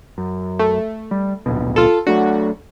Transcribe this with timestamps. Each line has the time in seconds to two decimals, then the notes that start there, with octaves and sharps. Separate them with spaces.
0.18 F#2
0.59 A3
1.11 G3
1.46 D1 A#1 B2
1.76 F4 A4
2.07 F#3 A3 D4 F#4